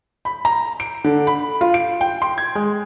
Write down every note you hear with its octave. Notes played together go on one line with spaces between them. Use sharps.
B5
A#5
D7
D3
B5
F4
D7
G5
C6
G#6
G#3